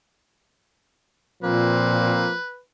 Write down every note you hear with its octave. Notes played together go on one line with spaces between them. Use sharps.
A#2 F3 A#3 C4 B4